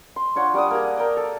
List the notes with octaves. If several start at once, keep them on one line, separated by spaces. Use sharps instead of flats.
C6
D4 F4 C#5 F#5
G3 D5 F#5 D#6
A#3 G#4
A#4 G5
A4